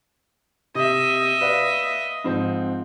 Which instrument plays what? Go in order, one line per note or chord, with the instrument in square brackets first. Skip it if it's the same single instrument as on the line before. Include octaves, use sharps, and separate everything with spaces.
[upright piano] C3 [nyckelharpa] D#5 E5
[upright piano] B4 D5 F5
G#2 F3 C4